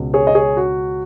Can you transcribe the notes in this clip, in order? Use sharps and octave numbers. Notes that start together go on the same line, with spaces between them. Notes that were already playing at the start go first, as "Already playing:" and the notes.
Already playing: C#2 B2
G#4 C#5
D#5
G#4 C#5
F#4